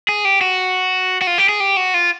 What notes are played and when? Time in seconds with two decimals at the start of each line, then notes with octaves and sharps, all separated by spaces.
0.09 G#4
0.25 G4
0.41 F#4
1.22 F#4
1.27 F4
1.38 G4
1.49 G#4
1.60 G4
1.77 F#4
1.94 F4